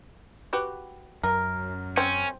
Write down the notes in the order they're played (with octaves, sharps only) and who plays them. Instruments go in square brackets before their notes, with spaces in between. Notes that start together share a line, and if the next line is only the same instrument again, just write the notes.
[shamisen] F#4 G4 B4
[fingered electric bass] F#2 [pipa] A#4
[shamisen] C4 [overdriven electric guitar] C#4